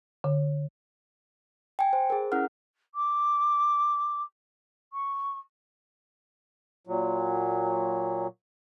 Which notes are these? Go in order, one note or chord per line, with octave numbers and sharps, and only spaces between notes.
D3
G5 G#5
C5
G#4 A#4
C#4 E4 A#4 F#5 F6
D6
C#6
A#2 F#3